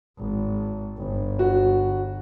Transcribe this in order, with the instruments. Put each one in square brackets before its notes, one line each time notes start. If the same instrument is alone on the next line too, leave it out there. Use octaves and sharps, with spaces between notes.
[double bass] G#1
G1
[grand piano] F#4